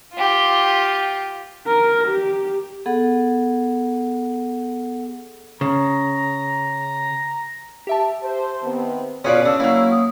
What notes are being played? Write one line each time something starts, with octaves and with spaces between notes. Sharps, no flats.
F4 G4
A#4
G4
B3 G#4 A4 F#5
C#3 A#5
G4 E5 A5
C5
D#3 B3 C4
B2 C#4 F4 G#4 B4 D5
C#3 D4 E6
F#3 A#3 C#4 E4
D#6